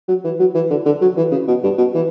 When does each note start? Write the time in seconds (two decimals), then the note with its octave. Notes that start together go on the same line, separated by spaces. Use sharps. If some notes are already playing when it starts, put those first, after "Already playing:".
0.08 F#3
0.24 E3
0.39 F#3
0.54 E3
0.70 D3
0.86 D3
1.01 F#3
1.17 E3
1.31 C#3
1.47 B2
1.63 G2
1.78 B2
1.94 E3